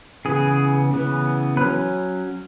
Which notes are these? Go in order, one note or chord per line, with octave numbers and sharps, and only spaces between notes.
C#3 E3 B3 G#4
C#3 E3 B3
F#3 C#4 B4